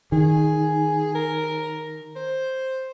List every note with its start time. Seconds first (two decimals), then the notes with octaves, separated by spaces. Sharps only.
0.12 D#3 G#4
1.15 A#4
2.16 C5